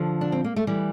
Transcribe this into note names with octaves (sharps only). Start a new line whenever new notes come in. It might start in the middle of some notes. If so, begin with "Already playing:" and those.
Already playing: D3 F3
D4
C4
A#3
A3
E3 G3